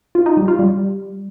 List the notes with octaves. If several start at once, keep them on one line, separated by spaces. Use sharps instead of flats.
F4
D#4
G3
F4
G3